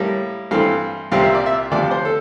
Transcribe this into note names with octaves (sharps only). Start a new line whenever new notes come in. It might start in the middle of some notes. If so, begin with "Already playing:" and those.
Already playing: A2 G3 A#3
G2 E3 A3 C4 F5
C2 A#2 G3 C4 F5
E5
D5
E5
D2 C3 F3 D5
C5
A4